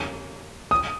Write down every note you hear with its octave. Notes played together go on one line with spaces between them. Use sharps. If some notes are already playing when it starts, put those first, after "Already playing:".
Already playing: F2 D3 G3 A#3 C#4
D#6